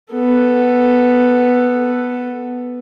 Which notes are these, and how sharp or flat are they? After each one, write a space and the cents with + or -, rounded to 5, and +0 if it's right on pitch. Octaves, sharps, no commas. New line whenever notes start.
B3 +0 A4 +5